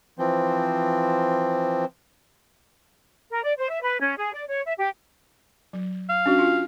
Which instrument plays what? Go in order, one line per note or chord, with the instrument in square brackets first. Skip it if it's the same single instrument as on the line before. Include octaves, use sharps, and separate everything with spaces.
[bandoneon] E3 F3 C4
[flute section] A#4
D5
C5
E5
B4
C#4
G#4
D5
C#5
E5
G4
[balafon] F#3
[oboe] F5
[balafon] C#4 D4 F#4
F4